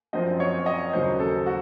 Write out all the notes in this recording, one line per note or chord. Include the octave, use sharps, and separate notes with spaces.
F#2 F3 C4 D#5
C#5
D#5
D#2 C#3 F#3 C5
A4
F#4